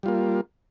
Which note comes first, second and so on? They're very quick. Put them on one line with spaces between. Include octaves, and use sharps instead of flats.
G3 F4 A#3